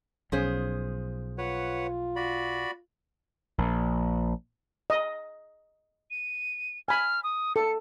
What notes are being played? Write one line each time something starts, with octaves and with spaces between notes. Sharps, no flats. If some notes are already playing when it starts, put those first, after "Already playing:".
B1 F3 C#4 G#4 C5
F4 B4 C#5 F#5
F#4 D5 B5
A#1
D#5
D#7
G#5 B5 F6
D#6
A4 C#7